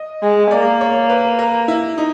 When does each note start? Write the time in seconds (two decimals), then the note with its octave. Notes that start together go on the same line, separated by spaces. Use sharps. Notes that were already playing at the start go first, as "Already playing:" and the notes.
Already playing: D#5
0.23 G#3
0.51 A#3 D5
0.81 C#5
1.10 B4
1.39 A#4
1.68 E4
1.98 D#4